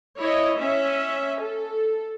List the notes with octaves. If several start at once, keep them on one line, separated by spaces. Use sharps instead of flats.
E4 C#5 D#5
C#4 E5
A4